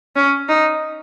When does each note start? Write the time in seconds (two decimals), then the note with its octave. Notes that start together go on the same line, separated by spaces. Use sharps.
0.16 C#4
0.49 D#4